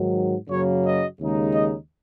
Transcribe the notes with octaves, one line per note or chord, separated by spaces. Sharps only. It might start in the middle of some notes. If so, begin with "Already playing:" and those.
Already playing: G#2 D#3 F#3
F#2 C#3 F#3 A#3 C#5
D#5
D#2 C#3 G#3 D#4
D#5